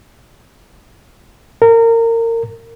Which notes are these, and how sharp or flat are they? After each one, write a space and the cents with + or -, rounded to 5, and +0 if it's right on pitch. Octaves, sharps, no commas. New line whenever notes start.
A#4 -25